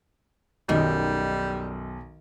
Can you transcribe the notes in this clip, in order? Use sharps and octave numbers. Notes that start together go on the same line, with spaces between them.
B1 F#2 D#3 G3 D#4